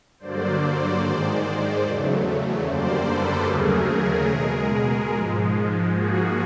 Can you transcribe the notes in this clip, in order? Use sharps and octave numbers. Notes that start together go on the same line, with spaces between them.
G2 D3 F#3 A#3 C5 D5
G#2 D#3 G#3
E2 C#3 F#3 A3
F#2 D3 G3 A#3 C5 D5
A4 B4
D#2 C#3 F#3 A3 G#4 A#4
B2 G#3
G#2 F3 G#3
G#2 F3 A#3 F#4 G#4